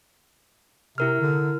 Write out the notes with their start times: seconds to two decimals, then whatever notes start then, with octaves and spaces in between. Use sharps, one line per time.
0.98 C3 E4 A#4 F6
1.21 D3